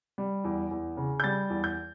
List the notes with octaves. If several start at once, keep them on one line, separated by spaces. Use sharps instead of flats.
G3
E2
E2
C#3
G6
G3 A6
E2
G6